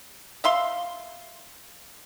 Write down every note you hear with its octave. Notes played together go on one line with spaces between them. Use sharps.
E5 F5 C6